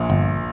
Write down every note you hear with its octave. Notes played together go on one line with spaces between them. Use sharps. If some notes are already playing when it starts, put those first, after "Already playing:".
Already playing: A#1 A#2
G1